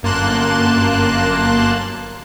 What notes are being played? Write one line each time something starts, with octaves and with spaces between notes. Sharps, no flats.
G1 F#2 A#3 A5 C6 F#6